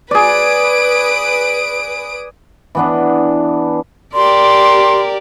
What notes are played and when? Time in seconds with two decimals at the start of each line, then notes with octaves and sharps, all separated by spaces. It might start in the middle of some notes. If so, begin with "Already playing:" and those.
0.11 G#4 B4 D5 D#6 D7
2.75 E3 B3 D4
4.14 G4 A#4 D5 C6